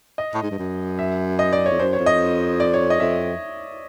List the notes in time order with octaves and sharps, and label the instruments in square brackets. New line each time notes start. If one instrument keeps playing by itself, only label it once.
[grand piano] D#5
[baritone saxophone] A2
G#2
G2
F#2
[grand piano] E5
D#5
D5
[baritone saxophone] F2 [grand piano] C#5
[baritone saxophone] F#2 [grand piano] C5
[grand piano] C#5
[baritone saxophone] F2
[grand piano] D#5
D5
C#5
D#5
[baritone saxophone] F2 [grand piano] E5